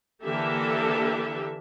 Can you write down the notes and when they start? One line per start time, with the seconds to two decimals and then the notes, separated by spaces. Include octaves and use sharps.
0.23 D3 E3 A#3 G4 A4 E5